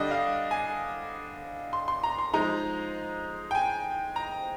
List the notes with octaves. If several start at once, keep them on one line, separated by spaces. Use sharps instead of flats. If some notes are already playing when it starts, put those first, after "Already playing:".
Already playing: D3 G3 D4 D#5
F5
G#5
C6
C6
A#5
C6
F3 G#3 D#4 A#5
G5
G#5
A#5